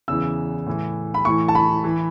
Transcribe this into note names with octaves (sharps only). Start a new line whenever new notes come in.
E2 C#3 E3 E6
A2 E3
B5
A2 E3 C#6
A5
B5
E3